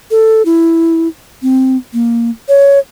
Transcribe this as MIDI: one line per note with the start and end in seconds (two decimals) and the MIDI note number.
0.11 0.42 69
0.45 1.08 64
1.42 1.77 60
1.93 2.30 58
2.48 2.79 73